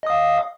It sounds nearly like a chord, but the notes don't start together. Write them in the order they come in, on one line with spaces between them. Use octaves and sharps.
D#5 D#6 F5